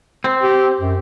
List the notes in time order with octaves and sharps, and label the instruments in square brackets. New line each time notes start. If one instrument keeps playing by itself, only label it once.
[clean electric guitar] C4
[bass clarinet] G4
F#2